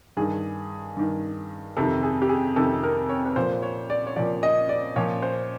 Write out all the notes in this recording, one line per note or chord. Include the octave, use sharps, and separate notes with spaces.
G2 D#3 G#4
G2 D#3
F2 C3 D#3 A4
G#4
G4
G#4
F2 C3 D#3 A4
A#4
C#5
B4
A#2 F3 C5
C#5
D5
C#5
A#2 F3 D5
D#5
D5
A#2 F3 C#5
C5